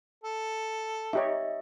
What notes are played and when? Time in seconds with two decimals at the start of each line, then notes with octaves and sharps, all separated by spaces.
0.24 A4
1.13 D#4 G4 C#5 D#5 E5